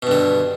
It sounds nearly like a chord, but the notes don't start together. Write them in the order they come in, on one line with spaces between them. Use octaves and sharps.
B2 G2 D3